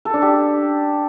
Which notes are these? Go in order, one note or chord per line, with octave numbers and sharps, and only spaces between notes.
A4
D4
G4